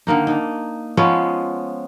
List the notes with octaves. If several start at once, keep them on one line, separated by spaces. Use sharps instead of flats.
D3 D#3 A#3 D#4
D4 D#4
F3 G#3 B3 C#4